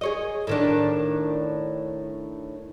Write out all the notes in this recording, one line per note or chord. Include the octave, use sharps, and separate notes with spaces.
G#4 C#5 D#5
A2 D#3 D4